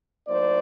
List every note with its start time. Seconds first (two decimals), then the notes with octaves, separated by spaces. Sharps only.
0.27 A2 F#3 A#3 D#4 C5 D5